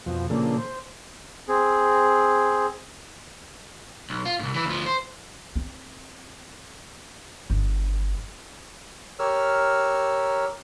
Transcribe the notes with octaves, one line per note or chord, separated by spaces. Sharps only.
F2 B2 F3
A#2 C#3 F3 A#3 D4 A4
C5
C4 G#4
B1
F4
C2 G#2
E3 B4
D2 F3
C5
C4
G1
G4 A#4 C#5 E6 F6